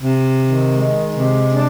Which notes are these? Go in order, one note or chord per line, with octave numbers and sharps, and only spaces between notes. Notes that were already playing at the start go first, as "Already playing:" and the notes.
C3
D#3
G#3
C3
D4